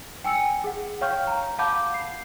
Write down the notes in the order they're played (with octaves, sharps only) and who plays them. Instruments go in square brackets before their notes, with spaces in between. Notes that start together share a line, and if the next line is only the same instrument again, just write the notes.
[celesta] G5 G#5 E6 C#7
G#4 F#5
C#5 F5 G5 C#6 F6 G6
A#5
F5 F#5 A5 B5 D6 G6
C7